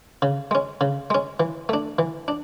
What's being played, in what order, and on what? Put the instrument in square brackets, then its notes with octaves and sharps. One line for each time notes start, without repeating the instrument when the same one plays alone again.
[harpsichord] C#3
G#3 C#4
C#3
G#3 C#4
E3
A3 D4
E3
D4